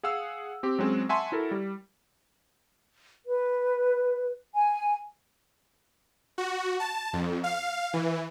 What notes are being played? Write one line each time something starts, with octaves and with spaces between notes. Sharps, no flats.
G#4 F5 F#5 E6
C4 G4
F#3 G#3 C4 C#4 G#4
E5 F#5 G#5 A5 C6 C#6
E4 F#4 A4 A#4
G3
B4
G#5
F#4
A5
F2
F5
E3